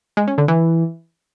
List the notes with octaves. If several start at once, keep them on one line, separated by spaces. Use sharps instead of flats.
G#3
C#4
D3
E3